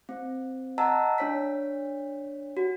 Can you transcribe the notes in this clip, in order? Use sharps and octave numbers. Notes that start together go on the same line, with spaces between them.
C4
D#5 F#5 A5 A#5 E6
D4 C#5 B6
F#4